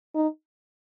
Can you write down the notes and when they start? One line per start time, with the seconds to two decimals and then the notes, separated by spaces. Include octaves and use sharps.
0.15 D#4